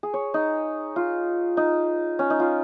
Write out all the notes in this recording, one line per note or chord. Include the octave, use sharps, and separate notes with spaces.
G#4
C#5
D#4
F4
D#4
C#4
D#4
F4